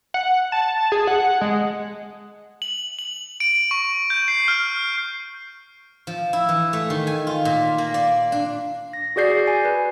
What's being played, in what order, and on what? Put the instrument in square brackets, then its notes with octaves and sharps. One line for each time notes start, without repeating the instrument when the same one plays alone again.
[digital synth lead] F#5
A5
G#4
F#5
G#3
[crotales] F#7
F#7
D7
C#6
G6
C7
F6
[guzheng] F3
E4
E3
A3
D#3
G#5
F4
A#2
A#3
D5
D4
[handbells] A#6
F#4 G#4 D5 G6 C7
G#5
B4